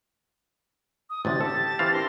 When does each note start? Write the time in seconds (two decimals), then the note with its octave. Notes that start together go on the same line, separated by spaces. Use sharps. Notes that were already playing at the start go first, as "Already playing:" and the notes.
1.10 D#6
1.25 A1 D2 C3 A6
1.41 G4 A4 A5
1.79 E3 C4 F5
1.93 D4 A#4 C6 A#6